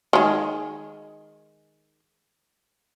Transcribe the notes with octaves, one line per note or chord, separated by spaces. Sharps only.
D#3 G#3